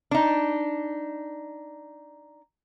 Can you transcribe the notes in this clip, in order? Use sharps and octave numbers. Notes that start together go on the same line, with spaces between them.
D4 D#4